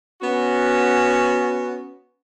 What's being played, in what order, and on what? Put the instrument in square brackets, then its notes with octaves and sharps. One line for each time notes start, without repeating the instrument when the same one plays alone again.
[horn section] B3 C#4 F#4